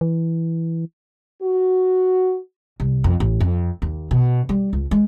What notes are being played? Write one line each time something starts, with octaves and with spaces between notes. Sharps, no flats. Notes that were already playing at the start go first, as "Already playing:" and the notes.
E3
F#4
C2
F2
A1
F2
D#2
B2
G3
C#2
G#3